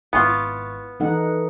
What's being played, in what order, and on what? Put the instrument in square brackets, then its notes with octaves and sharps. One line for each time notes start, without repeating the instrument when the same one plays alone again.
[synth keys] G#1 E4 C#6 [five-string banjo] B3 F4
[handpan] E3 D#4 F#5 [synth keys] A4